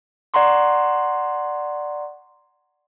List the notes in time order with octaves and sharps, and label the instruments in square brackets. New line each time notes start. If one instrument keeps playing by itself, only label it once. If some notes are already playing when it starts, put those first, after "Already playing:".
[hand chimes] D5 F#5 A#5 C6 C#6